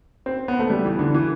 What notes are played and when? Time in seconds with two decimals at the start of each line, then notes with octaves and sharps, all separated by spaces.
0.26 C4
0.48 B3
0.59 A3
0.70 G3
0.85 E3
0.99 D3
1.14 E3